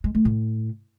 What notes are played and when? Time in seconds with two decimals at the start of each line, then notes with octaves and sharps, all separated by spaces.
0.04 G#3
0.15 A3
0.25 A2